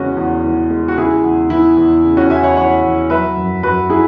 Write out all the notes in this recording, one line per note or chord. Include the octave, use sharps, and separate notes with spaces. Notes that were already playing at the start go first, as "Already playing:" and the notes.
Already playing: E2 C#3 E3 G#3 C#4 F#4
E2
E3
G#3
F#4
C#3 E4 G#4
E2
E3 E4
E2
C#3
C#4 F#4
E2 E5 G#5
C#5 F#5
E3 C#5 F#5
E2
F#3 B4 E5
F#2
F#2 F#4 B4
F#3 E4 G#4